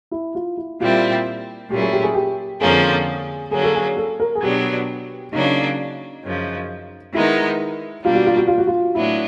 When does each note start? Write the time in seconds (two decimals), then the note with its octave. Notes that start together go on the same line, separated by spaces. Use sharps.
0.11 E4
0.35 F4
0.57 E4
0.80 A#2 G3 C4 E4 F4
1.70 A#2 F#3 A3 C#4 E4 G4
1.81 G#4
1.92 G4
2.03 G#4
2.14 G4
2.61 F2 D3 F3 A#3 C#4 G#4
3.51 D3 F#3 A#3 C#4 G#4
3.63 A4
3.75 G#4
3.97 A4
4.20 A#4
4.35 G#4
4.42 B2 F#3 B3 D4 G4
5.32 C#3 F#3 A#3 D4 D#4
6.23 F#2 C#3 F3
7.14 D#3 G#3 B3 D#4 E4
8.05 B2 G3 A#3 D4 F4
8.15 F#4
8.26 F4
8.37 F#4
8.47 F4
8.58 F#4
8.67 F4
8.95 A2 F#3 B3 D4 E4